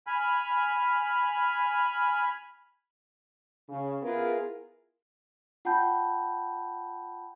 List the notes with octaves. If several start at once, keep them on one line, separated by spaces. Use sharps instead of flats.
G#5 B5 F6
C#3
B3 E4 F4 G#4 A#4
F4 F#5 G5 A5 B5 G6